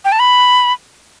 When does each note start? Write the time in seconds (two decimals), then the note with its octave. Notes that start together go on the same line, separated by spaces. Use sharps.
0.05 G5
0.12 A5
0.19 B5